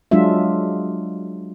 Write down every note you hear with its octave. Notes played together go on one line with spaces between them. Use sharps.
F#3 G#3 D4 F4 E5